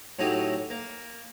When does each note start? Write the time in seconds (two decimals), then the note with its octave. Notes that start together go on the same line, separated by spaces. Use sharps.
0.19 A2 F#3 D#4 E4 G4 D#6
0.70 A#3